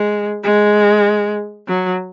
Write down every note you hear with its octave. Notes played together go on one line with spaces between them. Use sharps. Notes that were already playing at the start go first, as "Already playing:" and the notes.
Already playing: G#3
G#3
F#3